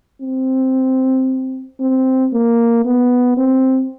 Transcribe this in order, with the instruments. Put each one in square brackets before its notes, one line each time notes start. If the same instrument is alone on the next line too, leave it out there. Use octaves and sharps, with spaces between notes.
[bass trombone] C4
C4
A#3
B3
C4